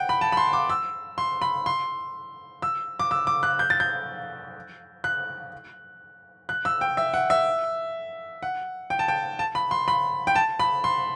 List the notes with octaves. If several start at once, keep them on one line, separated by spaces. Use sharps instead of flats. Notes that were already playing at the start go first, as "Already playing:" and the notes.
Already playing: F#5 G5
B5
A5
B5
C6
D6
E6
C6
B5
C6
E6
D6
E6
D6
F#6
G6
A6
G6
F#6
F#6
E6
G5
E5
F#5
E5
F#5
G5
A5
G5
A5
B5
C6
B5
G5
A5
B5
C6